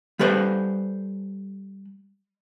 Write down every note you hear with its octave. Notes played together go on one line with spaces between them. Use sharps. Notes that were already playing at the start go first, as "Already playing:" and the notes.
G3 A4 B4 C5